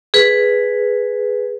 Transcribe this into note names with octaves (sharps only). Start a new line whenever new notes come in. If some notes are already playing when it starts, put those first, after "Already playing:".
G#4 B4